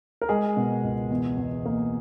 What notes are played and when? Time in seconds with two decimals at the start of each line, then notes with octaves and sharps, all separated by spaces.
0.22 A#4
0.29 G#3 G#4
0.57 B2
0.84 C#2
1.11 E2
1.37 E2
1.66 A#3